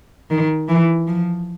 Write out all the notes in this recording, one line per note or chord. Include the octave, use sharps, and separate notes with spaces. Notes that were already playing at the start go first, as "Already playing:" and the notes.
D#3
E3
F3